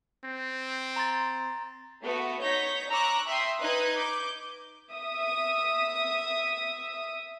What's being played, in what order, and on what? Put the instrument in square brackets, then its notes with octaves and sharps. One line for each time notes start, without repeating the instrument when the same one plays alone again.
[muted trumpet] C4
[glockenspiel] A#5 C6 A6
[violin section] A3 B3 F#4
D#4 C#5 G6 A#6 B6
A#5 C#6 D6 E6 F#6
E5 G5 C6 D#6
D#4 B4 D#5 F#6 G#6
D6 G6
E5 D#6